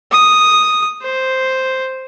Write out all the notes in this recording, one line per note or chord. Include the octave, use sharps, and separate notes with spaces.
D#6
C5